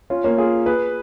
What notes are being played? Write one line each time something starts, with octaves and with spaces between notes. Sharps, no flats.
C#4 F4
A#3 C#4
F4 G#4
G#4 B4